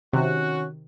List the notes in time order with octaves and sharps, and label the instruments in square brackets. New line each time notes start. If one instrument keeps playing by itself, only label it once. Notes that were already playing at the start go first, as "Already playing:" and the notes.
[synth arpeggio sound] C3 [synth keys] D#3 [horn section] C#4 F#4